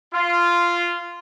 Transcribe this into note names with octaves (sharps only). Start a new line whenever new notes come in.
F4